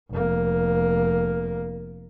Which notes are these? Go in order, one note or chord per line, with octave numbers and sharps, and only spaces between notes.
F1 A#3